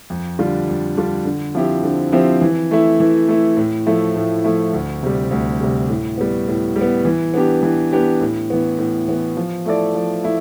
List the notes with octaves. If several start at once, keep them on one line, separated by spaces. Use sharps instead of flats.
F2
D3 G3 D4 F4
F2
D3 G3 D4 F4
D3
F3 C4 E4 G4
D3
F3 C4 E4 G4
E3
A3 E4
E3
A3 E4
A2
F3 A3 E4
A2
F3 A3 E4
D2
C3 G3
D2
C3 G3
A2
G3 B3
A2
G3
B3
E3
B3 D4 G4
E3
B3 D4 G4
A2
E3 B3
A2
E3 B3
F3
A3 E4 A4 D5
F3
A3 E4